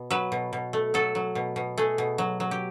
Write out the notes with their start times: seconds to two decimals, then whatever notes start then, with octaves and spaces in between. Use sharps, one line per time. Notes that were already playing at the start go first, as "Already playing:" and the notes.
Already playing: B2
0.10 F#3 B4
0.32 B2
0.53 B2
0.73 A3
0.94 F#3 A4
1.15 F#3
1.35 B2
1.56 B2
1.78 A3 G#4
1.98 B2
2.18 F#3
2.40 F#3
2.51 G4